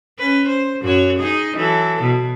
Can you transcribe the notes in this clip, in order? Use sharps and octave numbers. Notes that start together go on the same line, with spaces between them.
C#4 B4
C5
F#2 F#4 C#5
D#4 G#4 D#5
E3 F#3 A4
B2